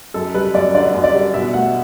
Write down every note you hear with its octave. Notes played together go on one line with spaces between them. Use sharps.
F#2 A4
G3 B4
F#2 D5
D3 D5
F#2
D5
G3
B2 E5
A3 F#5